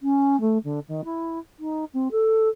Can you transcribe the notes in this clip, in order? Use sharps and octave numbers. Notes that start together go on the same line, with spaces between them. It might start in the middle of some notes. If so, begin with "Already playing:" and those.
C#4
A3
D3
D#3
E4
D#4
C4
A4